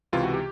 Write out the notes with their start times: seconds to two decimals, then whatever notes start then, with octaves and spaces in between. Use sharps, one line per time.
0.13 C#2 C3 E3 F4
0.23 F#4
0.33 G4